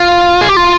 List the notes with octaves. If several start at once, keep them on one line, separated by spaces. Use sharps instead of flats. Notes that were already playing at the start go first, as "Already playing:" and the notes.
Already playing: F4
G#4
G4
F4